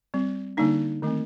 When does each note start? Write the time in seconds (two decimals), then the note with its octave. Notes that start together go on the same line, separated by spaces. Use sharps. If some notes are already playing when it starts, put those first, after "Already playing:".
0.14 G3 C4
0.57 D3 G3 A#3 D4 D#4
1.02 D#3 A3 C4